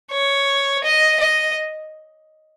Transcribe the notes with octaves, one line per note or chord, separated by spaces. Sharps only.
C#5
D#5
D#5